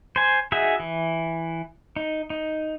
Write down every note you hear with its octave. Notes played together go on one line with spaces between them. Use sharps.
C5 G#5
D#4 F#4 G#4 E5
E3
D#4
D#4